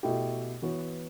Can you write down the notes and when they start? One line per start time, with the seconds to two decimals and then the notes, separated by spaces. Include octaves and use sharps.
0.03 B2 A3 E4 G4
0.62 E3 B3 F#4 C#5